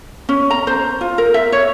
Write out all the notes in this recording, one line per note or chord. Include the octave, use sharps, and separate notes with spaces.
C#4
A#5
C5
F4
A#4
E5
C#5